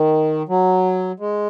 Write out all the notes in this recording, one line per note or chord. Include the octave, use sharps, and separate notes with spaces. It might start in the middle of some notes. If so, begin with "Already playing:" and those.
Already playing: D#3
F#3
G#3